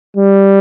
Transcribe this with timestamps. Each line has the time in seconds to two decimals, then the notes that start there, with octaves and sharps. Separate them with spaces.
0.16 G3